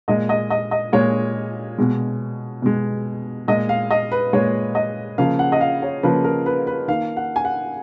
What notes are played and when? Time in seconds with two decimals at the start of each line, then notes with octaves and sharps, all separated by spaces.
0.08 A#2 G#3 D#5
0.29 D#5
0.50 D#5
0.71 D#5
0.93 A#2 G#3 C#5
1.78 B2 G#3
2.62 B2 G#3
3.48 A#2 G#3 D#5
3.69 F5
3.91 D#5
4.12 B4
4.33 A#2 G#3 C#5
4.75 D#5
5.18 C#3 F3 A#3 F5
5.39 F#5
5.52 D#5
5.61 F5
5.82 C#5
6.03 C#3 F3 A#3 B4
6.24 A#4
6.46 B4
6.67 B4
6.88 D#3 A#3 F5
7.17 F#5
7.36 G#5
7.45 F#5